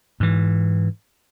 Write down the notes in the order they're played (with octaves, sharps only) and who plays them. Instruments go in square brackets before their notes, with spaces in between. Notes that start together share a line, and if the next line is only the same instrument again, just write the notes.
[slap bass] G#2 E3